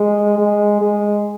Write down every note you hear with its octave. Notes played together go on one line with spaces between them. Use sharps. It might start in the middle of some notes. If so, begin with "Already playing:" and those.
Already playing: G#3
G#3
G#3